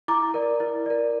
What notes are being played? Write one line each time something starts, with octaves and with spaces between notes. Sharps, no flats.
E4 A#5 D6
A#4 D5
E4
A#4 D5